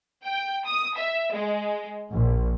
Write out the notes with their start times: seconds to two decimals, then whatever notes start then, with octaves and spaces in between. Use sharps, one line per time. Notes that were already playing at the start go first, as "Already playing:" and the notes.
0.25 G5
0.66 D#6
0.96 E5
1.33 G#3
2.12 A#1